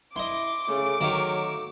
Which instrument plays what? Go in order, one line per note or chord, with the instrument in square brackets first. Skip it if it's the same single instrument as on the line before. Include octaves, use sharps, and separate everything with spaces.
[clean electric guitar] E4 [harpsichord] D#5 C6 [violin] D6
[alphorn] C#3 [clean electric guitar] A3
[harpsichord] D#3 F5 C#6 [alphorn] F#3